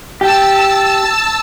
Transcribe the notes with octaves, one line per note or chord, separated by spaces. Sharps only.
G4 A5 E6